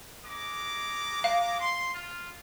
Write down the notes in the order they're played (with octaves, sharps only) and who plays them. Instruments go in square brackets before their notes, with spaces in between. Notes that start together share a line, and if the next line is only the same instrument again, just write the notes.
[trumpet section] G#3 A#5 D6
[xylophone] F5
[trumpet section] C6
F4